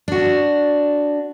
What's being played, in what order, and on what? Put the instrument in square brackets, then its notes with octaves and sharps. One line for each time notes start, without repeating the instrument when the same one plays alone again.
[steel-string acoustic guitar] D4 F#4